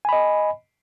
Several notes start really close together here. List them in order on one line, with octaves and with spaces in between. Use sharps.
G#5 B5 D#5